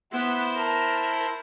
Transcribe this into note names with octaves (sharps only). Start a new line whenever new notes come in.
B3 E4 C5 F#5
A#4 A5